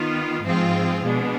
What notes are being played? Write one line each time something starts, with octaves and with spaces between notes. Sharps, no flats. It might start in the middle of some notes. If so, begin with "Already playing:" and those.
Already playing: D#3 B3 F4
G#2 F3 G#3 C4 F4
B2 G#3 D4